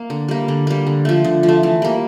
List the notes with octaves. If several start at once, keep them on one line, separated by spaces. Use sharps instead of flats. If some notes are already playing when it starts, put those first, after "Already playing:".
Already playing: A#3
D3
G3 A#3
D3
G3 A#3
D3
F3 A3
D3
F3
A3
E3
G3 A#3